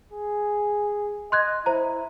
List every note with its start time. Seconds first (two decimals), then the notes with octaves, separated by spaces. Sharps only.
0.12 G#4
1.32 D#5 C6 F#6 G#6
1.66 E4 C5 A#5